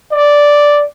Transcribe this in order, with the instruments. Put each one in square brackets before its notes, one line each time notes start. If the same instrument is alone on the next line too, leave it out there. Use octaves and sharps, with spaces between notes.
[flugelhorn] D5